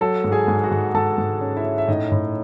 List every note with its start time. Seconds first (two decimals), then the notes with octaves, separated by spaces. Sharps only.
0.01 F#3 A4 A5
0.24 G#2
0.32 G#4 G#5
0.48 G#2
0.64 F#4 F#5
0.71 G#2
0.94 G#2 A4 A5
1.18 G#2
1.41 C#4
1.57 E4 E5
1.65 C#4
1.78 E5
1.88 A2 D#4 D#5
2.11 A2